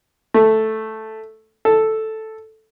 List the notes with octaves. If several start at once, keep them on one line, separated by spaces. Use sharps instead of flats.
A3
A4